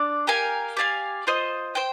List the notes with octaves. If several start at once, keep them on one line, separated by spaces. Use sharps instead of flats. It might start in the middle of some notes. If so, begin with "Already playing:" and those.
Already playing: D4 D5
G4 A#4 F5 G#5
G4 D5 F5 G#5
F4 C5 D#5
C5 G5